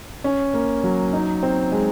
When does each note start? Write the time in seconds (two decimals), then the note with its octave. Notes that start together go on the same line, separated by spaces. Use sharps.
0.24 C#4
0.54 A#3
0.83 F#3
1.13 D#4
1.43 C4
1.72 G#3